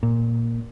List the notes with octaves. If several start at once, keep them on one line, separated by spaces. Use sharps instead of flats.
A#2